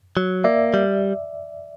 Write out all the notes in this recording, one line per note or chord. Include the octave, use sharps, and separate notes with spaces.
F#3
A#3 D5 E5
G3